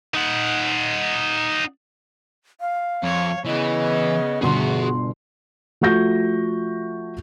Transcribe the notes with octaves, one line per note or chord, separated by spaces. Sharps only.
D#4 F#5
F5
F2 C#5
C#3 E3 B3 D#5
G1 B2 F#4 G#4 E5 C6
F3 A3 F#4 C#6 G6 A#6